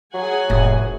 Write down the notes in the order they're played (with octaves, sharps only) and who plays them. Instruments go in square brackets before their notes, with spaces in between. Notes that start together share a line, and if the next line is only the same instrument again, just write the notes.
[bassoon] F#3 [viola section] G#4 F#5 G#5
[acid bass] F1 [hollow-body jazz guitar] A2